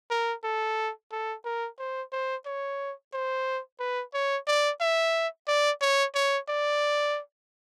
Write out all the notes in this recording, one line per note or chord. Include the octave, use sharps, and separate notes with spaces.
A#4
A4
A4
A#4
C5
C5
C#5
C5
B4
C#5
D5
E5
D5
C#5
C#5
D5